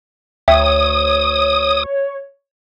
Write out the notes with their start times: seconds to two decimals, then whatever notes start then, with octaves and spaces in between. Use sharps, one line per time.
0.48 D2 C#5 E5 G5 D#6